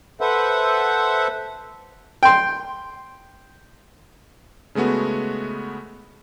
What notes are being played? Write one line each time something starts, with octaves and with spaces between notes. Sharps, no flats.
A4 B4 C5 E5 F#5
G5 C6
C#3 G#3 A3 B3 F#4